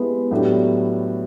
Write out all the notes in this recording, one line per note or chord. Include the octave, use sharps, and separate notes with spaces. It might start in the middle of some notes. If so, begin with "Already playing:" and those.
Already playing: G#3 B3 E4 G4
A2 F#3 B3 D4 G4